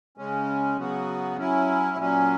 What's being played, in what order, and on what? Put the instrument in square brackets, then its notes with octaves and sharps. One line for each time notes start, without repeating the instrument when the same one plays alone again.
[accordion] C#3 G#3 C#4
C#3 F#3 B3 F#4
F#3 C#4 E4
A#2 F#3 C#4